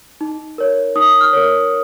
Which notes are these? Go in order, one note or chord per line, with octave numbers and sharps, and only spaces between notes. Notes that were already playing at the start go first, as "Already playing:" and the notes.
D#4
A#4 C#5
D#4 D#6
F6
A#4 C#5